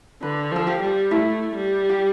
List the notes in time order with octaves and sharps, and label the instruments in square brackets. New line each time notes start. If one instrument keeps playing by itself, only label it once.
[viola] D3 [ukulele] B4
[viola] F3 [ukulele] A4
[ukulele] G4
[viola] G3
[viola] A3 [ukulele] E4
[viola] G3
[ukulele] G4